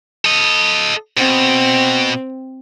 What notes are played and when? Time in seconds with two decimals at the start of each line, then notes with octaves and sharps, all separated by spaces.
0.25 A4 D#5
1.17 B2 C4